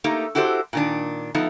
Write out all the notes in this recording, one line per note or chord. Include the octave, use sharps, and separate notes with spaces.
A3 A#3 D#4 G4
E4 F#4 G4 A4 C5
A#2 D#3 D4
F3 A3 B3 D#4